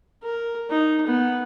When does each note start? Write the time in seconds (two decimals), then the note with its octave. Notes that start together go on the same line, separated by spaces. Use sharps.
0.23 A#4
0.70 D#4
1.07 B3